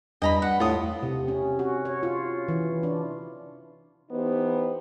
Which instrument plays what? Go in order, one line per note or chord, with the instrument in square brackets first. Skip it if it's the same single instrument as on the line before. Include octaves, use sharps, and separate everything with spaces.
[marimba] E2 [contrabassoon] G2 [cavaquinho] D#5 A#5 B5
[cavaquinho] F#5
[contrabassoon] A2 [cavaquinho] F4 D#6
[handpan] C3
C#4
F#4
C#5
F4
E3
D4
[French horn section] E3 B3 D#4 G4 C5